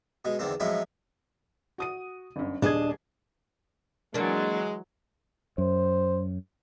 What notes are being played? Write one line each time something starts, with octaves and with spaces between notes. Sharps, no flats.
B2 G#3
E2 D3 D#3 C4
F2 A2 F#3 G#3 C#4 E4
F#4 D#6 D#7
G1 F#2
D#1 D4 G#4 D#5 G#6
E3 F#3 G#3 A#3 D4
F#2 C5